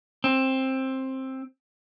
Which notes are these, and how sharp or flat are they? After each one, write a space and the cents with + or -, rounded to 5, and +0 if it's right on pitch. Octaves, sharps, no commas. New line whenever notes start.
C4 +15